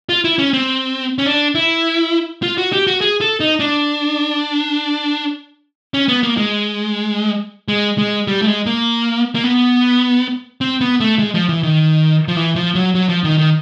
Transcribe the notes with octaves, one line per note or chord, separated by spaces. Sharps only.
F4
E4
C#4
C4
C#4
D4
E4
F4
F#4
G4
F#4
G#4
A4
D#4
D4
C#4
B3
A#3
G#3
G#3
G#3
G3
A3
G#3
A#3
A#3
B3
C4
B3
A3
G#3
F3
E3
D#3
F3
E3
F3
F#3
F#3
F3
D#3
D#3